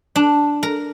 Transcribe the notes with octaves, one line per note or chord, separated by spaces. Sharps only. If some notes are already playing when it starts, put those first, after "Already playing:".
D4
A#4